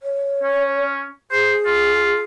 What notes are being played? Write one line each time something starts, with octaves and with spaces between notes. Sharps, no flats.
C#5
C#4
G#4 C5
F4